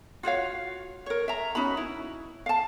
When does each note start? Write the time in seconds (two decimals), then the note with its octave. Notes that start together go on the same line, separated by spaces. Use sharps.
0.23 F4 F#4 C#5 F5
1.06 A#4 C#5
1.28 E5 A#5
1.55 C#4 D#4 F#4 B5
1.77 E4
2.46 F5 A5